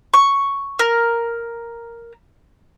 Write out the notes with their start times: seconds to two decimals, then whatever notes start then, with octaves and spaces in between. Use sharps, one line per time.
0.14 C#6
0.79 A#4